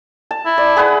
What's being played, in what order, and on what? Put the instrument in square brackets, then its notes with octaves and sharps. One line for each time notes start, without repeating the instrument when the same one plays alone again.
[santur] A5
[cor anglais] E4
[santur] D5
G#4 B4 F#5